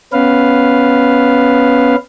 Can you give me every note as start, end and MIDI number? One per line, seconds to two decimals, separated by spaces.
0.13 1.96 59
0.13 1.96 61
0.13 1.96 71
0.13 1.96 77